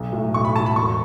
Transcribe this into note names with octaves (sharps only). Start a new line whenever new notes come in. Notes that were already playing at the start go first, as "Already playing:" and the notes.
Already playing: B1
A2 F#3
B1 C#6
B5
A2 F#3 A5
B5
E1 C#6